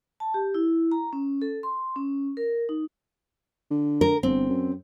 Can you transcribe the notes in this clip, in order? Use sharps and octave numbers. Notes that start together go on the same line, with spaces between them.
A5
G4
E4
A#5
C#4
A4
C6
C#4
A#4
D#4
D3
A#4
G1 C4
F#2